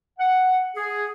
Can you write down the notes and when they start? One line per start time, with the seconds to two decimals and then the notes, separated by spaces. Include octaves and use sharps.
0.19 F#5
0.76 G#4